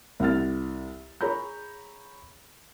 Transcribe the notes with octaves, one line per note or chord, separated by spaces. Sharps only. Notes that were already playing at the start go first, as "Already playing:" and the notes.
C2 F#5 F6 A6
G#4 C#5 A#5 B5 G6